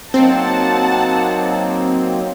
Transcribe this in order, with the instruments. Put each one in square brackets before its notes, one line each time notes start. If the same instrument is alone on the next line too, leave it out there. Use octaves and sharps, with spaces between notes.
[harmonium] F#3 A#3 D#4 [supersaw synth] C4 [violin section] F#5 A5